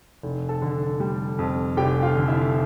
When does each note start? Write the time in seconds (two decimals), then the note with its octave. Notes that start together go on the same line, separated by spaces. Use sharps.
0.23 F1
0.49 A4 A5
0.62 D3
1.00 G3
1.39 F2
1.77 F1 G4 G5
2.02 F4 F5
2.15 D3
2.28 E4 E5